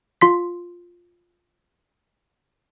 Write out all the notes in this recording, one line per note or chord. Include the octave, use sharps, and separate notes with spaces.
F4 C6 B6